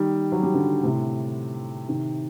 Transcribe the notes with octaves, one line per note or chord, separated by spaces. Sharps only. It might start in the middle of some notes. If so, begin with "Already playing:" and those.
Already playing: D#3 G3
F#3
G3
D3 F#3
A2 C3
C3 D#3